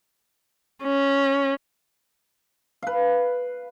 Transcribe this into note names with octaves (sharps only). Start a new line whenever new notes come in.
C#4
B4 F5